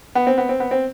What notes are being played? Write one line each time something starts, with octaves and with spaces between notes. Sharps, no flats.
B3
C4
B3
C4
B3
C4